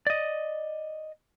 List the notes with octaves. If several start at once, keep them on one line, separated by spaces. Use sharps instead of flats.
D5 D#5